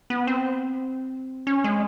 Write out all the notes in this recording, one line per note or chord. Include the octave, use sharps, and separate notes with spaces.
B3
C4
C#4
G#3